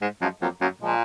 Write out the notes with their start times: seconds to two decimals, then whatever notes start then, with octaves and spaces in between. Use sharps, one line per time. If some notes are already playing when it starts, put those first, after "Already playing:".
0.01 G#2
0.21 F#2 F3 G#3
0.41 F2 F#3 A#3
0.61 F#2 F#3 A#3
0.81 A#2 F3 G#3